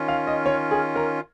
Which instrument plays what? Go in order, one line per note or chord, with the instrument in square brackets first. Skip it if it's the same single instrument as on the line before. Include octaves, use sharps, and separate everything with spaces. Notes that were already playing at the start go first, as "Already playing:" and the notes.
Already playing: [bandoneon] D#3 C#4 F4
[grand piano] F5
D#5
C#5
G#4
A#4